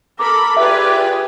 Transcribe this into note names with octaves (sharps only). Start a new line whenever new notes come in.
A4 A#4 B5 D6
F4 G4 G#4 B4 D5 E5